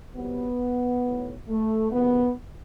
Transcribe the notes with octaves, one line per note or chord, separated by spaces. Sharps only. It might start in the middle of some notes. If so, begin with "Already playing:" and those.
C2 C3 F#3 B3
B1 A2 F#3
A3
F#1 E2 C3 D#3 B3